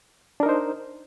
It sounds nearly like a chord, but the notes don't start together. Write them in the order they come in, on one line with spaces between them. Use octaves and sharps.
D4 A#4 D#4 C5